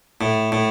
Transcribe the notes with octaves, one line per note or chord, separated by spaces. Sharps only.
A2
A2